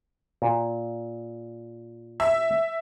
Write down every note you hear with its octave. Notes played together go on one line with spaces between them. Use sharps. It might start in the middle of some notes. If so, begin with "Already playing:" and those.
A#2
E5